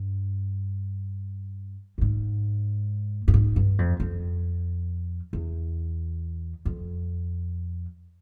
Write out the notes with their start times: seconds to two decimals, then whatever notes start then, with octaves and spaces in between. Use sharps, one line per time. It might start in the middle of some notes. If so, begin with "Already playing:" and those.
Already playing: G2
1.98 G2
2.01 G#2
3.28 G2
3.34 G#2
3.56 G2
3.79 F2
4.00 F2
5.33 E2
6.65 F2